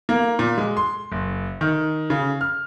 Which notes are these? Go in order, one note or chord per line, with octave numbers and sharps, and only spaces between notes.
A#3
A#2
G#3
C6
F#1
D#3
C#3
F6